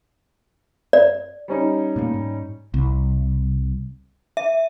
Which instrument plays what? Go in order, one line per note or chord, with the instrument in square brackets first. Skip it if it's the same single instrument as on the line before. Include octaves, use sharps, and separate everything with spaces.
[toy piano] D5
[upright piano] G3 C#4 D#4
[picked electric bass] A#2 A3 A#3
G#2
[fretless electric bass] C2
[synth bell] E5